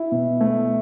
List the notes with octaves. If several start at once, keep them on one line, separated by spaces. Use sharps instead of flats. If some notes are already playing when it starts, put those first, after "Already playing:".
Already playing: E4
B2
A3